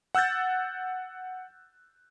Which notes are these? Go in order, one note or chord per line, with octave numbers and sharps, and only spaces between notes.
F#5 E6 F#6 G6 A6